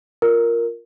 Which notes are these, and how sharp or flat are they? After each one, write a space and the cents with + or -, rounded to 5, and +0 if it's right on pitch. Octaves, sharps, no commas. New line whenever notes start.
F4 +0 A#4 +0